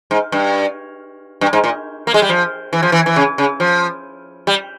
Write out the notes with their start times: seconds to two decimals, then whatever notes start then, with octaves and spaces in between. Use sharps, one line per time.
0.11 G#2
0.32 G2
1.41 G2
1.53 G#2
1.64 A#2
2.07 A#3
2.14 G#3
2.22 G3
2.29 F3
2.73 E3
2.83 F3
2.92 E3
3.06 E3
3.16 C#3
3.38 C#3
3.60 F3
4.47 G3